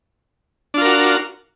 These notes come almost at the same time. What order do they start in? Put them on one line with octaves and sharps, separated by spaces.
D4 F4 A#4 F#4